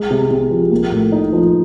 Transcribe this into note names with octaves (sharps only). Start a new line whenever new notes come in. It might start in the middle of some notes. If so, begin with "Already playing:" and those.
Already playing: G#3
C3
C3
F3
A#3
A2
D#4
F3